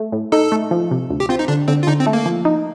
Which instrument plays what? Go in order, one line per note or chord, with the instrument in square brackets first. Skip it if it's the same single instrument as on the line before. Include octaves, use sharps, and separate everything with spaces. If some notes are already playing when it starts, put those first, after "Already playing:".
Already playing: [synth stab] A3
A2
[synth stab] D#4 [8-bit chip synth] A4
[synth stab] A3
F3
C3
D2
[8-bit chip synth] G4
[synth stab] C4 [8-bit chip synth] F4
[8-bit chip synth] D#4
[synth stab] D3 [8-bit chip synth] D4
[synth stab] D3 [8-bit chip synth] C4
[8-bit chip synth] F4
[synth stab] D3 [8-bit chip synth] D#4
[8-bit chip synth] C4
[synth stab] A3
[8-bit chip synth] A#3
[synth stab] F3
D#4